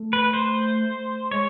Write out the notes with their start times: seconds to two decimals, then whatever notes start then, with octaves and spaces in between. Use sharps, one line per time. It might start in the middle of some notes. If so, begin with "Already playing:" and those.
Already playing: A3
0.13 B4
0.33 C5
1.31 G#3 C#5